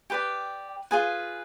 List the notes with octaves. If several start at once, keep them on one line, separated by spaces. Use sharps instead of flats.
G4 B4 D5 G5
F4 G#4 B4 G#5